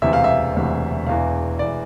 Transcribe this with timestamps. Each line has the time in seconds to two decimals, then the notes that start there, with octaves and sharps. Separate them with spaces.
0.02 E1 D2 C3 E3 E5
0.13 F5
0.24 E5
0.55 E1 D2 C3 E3
1.07 E1 E2 E3 F5
1.59 E1 E3 D5